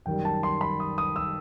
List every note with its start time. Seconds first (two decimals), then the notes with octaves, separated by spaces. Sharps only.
0.06 F#2 D#3 G3 G5
0.25 A5
0.43 C6
0.61 B5
0.80 D#6
0.98 D#6
1.16 E6